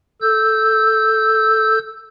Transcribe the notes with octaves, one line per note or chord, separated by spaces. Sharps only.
A4 E6 G6